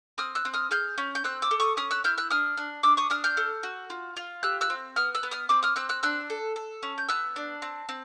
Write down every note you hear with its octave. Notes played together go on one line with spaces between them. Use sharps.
C4 D#6 F6
E6 F#6
C4
D#6 F6
G#4 F6 G6
C#4
G6
C4 E6 F#6
D6 E6
A4
C#6 D#6
C#4 D#6 F6
E6 F#6
E4 F6 G6
E6 F#6
D4 D#6 F6
D4
D4 D6 E6
C#6 D#6
D4 D#6 F6
F6 G6
A4
F#4
F4
F4
G4 E6 F#6
E6 F#6
C4
B3 D#6 F6
E6 F#6
B3
D#6 F6
C4 D6 E6
D#6 F6
C4 E6 F#6
E6 F#6
D4 E6 F#6
A4
A4
C#4
G6
B3 E6 F#6
D4
C4
C4